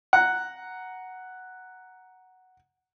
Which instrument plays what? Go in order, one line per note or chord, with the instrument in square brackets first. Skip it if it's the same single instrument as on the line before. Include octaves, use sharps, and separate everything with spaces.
[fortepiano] F#5 A#5